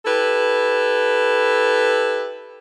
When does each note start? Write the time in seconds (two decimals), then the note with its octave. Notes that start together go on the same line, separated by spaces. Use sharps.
0.06 E4 G4 A4 B4